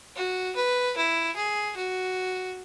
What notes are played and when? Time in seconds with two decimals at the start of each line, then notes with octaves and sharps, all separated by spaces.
0.16 F#4
0.56 B4
0.97 E4
1.36 G#4
1.77 F#4